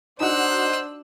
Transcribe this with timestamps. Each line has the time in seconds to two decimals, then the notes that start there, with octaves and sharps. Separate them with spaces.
0.20 D4 D#4 F#4 C5 E6 F#6